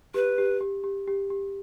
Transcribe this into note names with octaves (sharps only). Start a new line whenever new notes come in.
G4 B4
G4
G4
G4
G4
G4